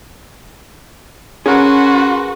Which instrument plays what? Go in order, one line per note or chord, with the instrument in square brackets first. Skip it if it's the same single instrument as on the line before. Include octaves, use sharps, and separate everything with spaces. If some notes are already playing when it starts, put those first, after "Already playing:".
[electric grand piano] C#4 [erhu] F#4 [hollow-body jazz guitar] G#4 A#4 [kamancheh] B4 C6